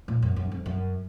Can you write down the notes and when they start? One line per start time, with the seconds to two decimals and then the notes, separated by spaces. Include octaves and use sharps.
0.08 A#2
0.22 F#2
0.36 F#2
0.52 F2
0.66 F#2